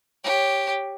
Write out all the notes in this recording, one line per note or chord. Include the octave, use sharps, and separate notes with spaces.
G4 C#5